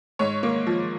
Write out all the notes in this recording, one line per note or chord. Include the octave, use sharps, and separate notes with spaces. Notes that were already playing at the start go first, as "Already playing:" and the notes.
G#2 C#5
A#3
F3